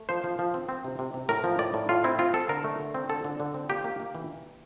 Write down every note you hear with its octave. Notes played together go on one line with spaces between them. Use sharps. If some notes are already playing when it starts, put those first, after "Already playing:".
Already playing: A3
F3 C5
F3
F3
C4
C4
C3
C3
C3
A2 A#4
F3
A2 D5
A2
A2 F4
C4 E4
C4 F4
C4 A4
D3 A#4
A3
D3
C4
D3 A4
D3
D3
C4
A#3 G4
A#3
A#3
E3